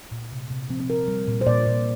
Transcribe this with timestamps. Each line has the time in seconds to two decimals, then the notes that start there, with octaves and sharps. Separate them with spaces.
0.12 A#2
0.32 C3
0.50 C3
0.69 F3 C4
0.80 C4
0.89 F3 A#4
1.08 G3
1.27 A#2
1.41 C5
1.46 A#2 D5
1.66 A#2